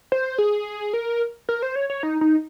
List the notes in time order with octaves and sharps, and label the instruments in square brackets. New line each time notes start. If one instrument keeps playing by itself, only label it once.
[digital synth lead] C5
G#4
A#4
A#4
C5
C#5
C#5
D#4
D#4